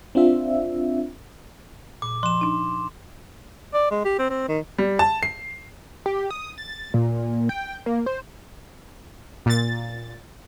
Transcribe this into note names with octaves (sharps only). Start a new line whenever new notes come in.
C4 D4 F4 E5
A#2 D6
F3 C6 E7
D4 D#4
D5
G#3
G4
C4
C4
D#3
G3
A5
C7
G4
D#6
A6
A#2
G5
A#3
C5
A#2 A6